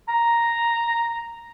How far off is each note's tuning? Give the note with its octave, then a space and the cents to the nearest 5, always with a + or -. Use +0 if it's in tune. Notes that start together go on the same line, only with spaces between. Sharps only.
A#5 +0